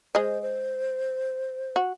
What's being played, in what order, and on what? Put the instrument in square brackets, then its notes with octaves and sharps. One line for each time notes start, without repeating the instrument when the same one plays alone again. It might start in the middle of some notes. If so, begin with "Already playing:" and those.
[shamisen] G#3 G#4 D#5 [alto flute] C5
[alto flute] C5
[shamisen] F#4